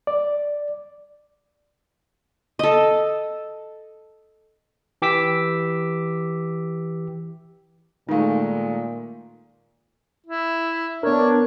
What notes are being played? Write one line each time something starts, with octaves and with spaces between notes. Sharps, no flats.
D5
A4 D#5
E3 G4 D6 E6 B6
A#2 D#3 G#3 A3 D#4 F5
E4
B3 D4 A#4 C#5